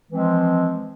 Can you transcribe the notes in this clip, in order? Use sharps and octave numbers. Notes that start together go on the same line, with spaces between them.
E3 F3 G#3 C4